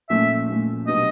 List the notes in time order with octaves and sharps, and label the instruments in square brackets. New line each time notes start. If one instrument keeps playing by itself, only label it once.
[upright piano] A#2 F3 A3 C#4 [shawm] E5
[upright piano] A#2 F3 A3 C#4
[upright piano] B2 F#3 B3 D4 G4 [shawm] D#5